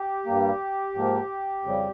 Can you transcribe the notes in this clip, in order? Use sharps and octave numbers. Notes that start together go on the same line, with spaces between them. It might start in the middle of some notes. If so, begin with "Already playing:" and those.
Already playing: G4
G2 G3 A#3
G#2 F3 A#3
F2 C#3 G3